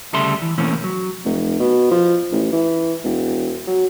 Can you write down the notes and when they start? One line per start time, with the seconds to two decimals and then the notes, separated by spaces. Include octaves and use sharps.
0.13 D2 C#3 G3 A4 E5 C6
0.42 E3
0.58 B2 E3 A3 A#3 C4 C#4
0.84 F#3
1.25 F1
1.59 B2
1.91 F3
2.32 A1
2.52 E3
3.04 E1
3.67 F#3